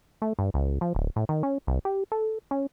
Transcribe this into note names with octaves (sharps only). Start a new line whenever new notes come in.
A3
G2
C#2
F3
D1
A2
D#3
C#4
C2
G4
A4
C#4